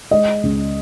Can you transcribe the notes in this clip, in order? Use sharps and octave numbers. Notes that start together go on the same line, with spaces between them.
G#3 D#5
C#2